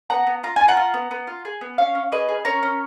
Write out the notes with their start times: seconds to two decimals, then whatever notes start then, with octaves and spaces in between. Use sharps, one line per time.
0.10 B3 F#5 A#5
0.27 B3
0.44 F4 A#5
0.56 F4 G#5
0.68 F#5 A#5
0.77 F4
0.94 B3
1.11 B3
1.27 F4
1.45 G#4
1.61 B3
1.78 C#4 C#5 F5
1.95 C#4
2.12 G#4 B4 D#5
2.28 G#4
2.45 C#4 A#4 C#5
2.63 C#4